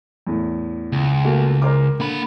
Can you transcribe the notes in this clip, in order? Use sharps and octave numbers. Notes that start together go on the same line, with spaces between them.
E2 A2
C#2
A3 A#3 F#4
A#4 C5 D6
D3 A#3 B5